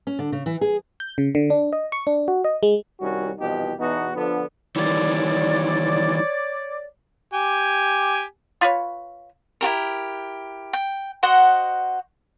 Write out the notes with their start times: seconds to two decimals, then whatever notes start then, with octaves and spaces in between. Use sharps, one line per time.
0.07 C#4
0.19 D3
0.32 C#3
0.46 E3
0.61 G#4
1.00 G6
1.18 C#3
1.35 D3
1.50 D4
1.73 D#5
1.92 C#6
2.07 D4
2.28 F#4
2.44 D#5
2.63 G#3
3.00 C2 D#3 G3 C#4 F#4
3.38 C2 B2 E3 F3 D#4 G4
3.79 E2 B2 E3 B3 D#4 F#4
4.14 D3 F3 B3
4.76 D#3 E3 G3 C#5 D5
7.34 G4 G#5
8.61 F4 B4 C#5
9.61 E4 F#4 G4 A#4
10.73 G5
11.23 F#4 C5 D#5 F#5